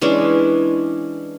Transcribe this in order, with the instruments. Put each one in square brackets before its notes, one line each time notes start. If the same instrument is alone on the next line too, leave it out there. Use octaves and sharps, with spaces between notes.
[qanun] E3 G#3 C#4 D4